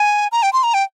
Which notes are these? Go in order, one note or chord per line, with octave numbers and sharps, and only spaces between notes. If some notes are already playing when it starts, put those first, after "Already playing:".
Already playing: G#5
A#5
G5
C6
A#5
G5